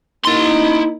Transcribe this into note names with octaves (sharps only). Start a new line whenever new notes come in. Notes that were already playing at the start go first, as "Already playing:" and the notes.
A#3 D#4 E4 C6